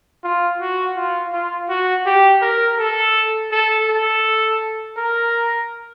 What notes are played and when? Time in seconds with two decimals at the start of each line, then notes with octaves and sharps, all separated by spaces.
0.24 F4
0.60 F#4
0.97 F4
1.33 F4
1.69 F#4
2.06 G4
2.42 A#4
2.79 A4
3.52 A4
3.88 A4
4.97 A#4